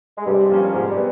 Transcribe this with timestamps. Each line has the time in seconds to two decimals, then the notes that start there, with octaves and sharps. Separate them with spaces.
0.18 G#3
0.26 G2 C3 G3
0.50 F3 A#3 C#4
0.73 G#2 C3 G#3
0.89 G3
0.97 B3